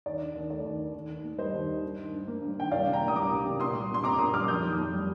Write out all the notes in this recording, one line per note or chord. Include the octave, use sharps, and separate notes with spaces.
D#2 D5
D3
D#2
A3 D5
D#2
D3
D#2
D#3
A#3
G3 C5 D#5
D#2
D#3
G2
D#3
G2
A#3
G2
D#3 G5
C2 D5 F5
C3
G5 A#5
A#3
D#6
G3 A#5 D6
C2
C3
A#2 C6 D#6
G3
A#2 C6
C4 A#5 D6
A#2 C6 D#6
G3 D6 F6
F2 D#6 G6
D#3
F2
G3